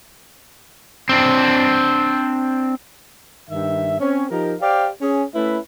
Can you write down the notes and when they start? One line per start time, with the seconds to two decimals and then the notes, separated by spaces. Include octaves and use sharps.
1.09 C4 D4
3.50 G2 D#3 E5
4.00 C4 C#4
4.31 F3 D#4 G4 A#4
4.61 G4 C5 D5 F5 G5
5.01 C#4 G#4
5.35 A3 C#4 E4 B4 E5